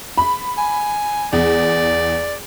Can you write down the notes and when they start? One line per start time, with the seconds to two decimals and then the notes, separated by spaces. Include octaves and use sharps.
0.18 B5
0.58 G#5
1.33 E2 D5